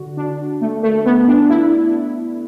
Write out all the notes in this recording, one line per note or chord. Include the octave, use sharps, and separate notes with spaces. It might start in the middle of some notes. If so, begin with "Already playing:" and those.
Already playing: D3 F#4
D4
A3
A3
B3
D4
E4